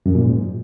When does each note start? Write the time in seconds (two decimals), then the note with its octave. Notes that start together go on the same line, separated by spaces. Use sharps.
0.06 F#2
0.15 A#2
0.24 G#2